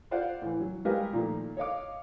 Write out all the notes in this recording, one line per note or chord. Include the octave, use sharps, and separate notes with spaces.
F4 C5 D5 F5 F#5
A2 E3
F#3
G3 G#3 G4 A#4 B4 F5
A#2 D#3 F3 A3
C#5 D#5 F5 D6